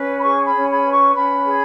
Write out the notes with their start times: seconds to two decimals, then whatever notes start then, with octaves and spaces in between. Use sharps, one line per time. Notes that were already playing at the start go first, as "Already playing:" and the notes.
Already playing: C#4 B4
0.17 B5
0.23 G#4 C#6
0.46 B5
0.54 C#4
0.69 B5
0.84 B4
0.91 C#6
1.14 C#4 B5
1.45 G#4